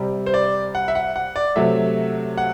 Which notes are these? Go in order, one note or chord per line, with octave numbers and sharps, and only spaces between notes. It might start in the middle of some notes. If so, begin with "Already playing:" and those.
Already playing: C3 G3
C5
D5
F#5
E5
F#5
F#5
D5
C3 F#3 A3 E5
F#5